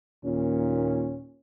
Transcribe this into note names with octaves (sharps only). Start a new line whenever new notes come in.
D#2 A#2 C#4